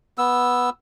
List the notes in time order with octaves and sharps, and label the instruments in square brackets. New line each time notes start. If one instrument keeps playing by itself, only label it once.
[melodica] B3 E6